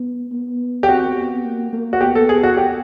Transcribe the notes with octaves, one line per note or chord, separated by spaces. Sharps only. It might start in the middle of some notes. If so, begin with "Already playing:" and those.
Already playing: B3
B3
G4
C4 F#4
B3
A#3
A#3
F#4
B3 G4
A4
G#4
F#4
G4